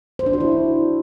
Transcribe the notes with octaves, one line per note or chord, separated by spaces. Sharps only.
C5
D4
F#4
E4